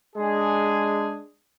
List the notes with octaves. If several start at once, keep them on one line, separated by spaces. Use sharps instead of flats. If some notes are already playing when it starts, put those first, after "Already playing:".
G#3 D4 G#4